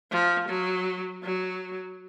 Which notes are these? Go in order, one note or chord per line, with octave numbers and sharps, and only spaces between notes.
F3
F#3
F#3